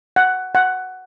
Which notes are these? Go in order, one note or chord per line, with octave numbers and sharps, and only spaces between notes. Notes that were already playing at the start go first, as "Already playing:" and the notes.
F#5
F#5